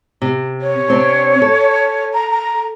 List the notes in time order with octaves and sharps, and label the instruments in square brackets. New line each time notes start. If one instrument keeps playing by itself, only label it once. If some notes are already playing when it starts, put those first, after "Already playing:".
[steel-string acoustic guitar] C3
[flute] C#5
[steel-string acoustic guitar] C3 C4 D4
A4
[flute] A#5
A#5